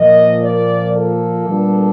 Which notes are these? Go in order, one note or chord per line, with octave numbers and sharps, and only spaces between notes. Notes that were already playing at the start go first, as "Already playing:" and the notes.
Already playing: A#2 F3 A#3 D#5
D5
A4
A#2 G3 B3 D4